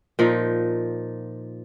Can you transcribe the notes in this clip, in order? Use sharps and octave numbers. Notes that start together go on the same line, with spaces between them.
A#2 F3 D#4